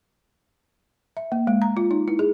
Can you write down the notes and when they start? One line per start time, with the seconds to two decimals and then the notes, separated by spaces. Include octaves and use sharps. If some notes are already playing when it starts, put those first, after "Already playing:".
1.17 E5
1.32 A#3
1.47 G#3
1.62 A#5
1.77 F4
1.91 D#4
2.08 E4
2.19 G#4